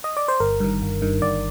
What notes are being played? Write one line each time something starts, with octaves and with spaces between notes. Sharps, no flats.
D#5
D5
C5
G1 A#4
G2 D#3
G1
G2 D#3
G1 D5